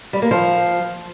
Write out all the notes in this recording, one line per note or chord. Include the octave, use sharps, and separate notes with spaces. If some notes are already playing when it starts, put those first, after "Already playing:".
G3
A#3
F3